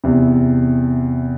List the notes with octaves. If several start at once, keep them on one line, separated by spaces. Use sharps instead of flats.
E2 C3